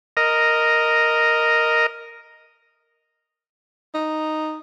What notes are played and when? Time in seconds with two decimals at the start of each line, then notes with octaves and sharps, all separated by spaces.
0.17 A#4 D#5
3.94 D#4